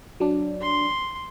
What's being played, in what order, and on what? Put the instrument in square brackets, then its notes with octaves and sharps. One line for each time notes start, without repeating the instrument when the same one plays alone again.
[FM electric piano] F#3 D4
[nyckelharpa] C6